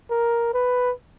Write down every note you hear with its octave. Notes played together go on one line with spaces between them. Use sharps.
A#4
B4